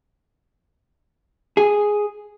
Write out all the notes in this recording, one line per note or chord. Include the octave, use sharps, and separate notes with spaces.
G#4